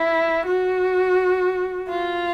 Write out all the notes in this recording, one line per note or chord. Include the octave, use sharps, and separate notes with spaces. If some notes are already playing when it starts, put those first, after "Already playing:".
Already playing: E4
F#4
F4